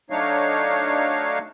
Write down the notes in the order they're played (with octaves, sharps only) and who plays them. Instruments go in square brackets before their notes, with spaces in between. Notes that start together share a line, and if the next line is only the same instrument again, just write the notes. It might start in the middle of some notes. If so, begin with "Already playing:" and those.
[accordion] F#3 A3 D4 D#4 C#5 F5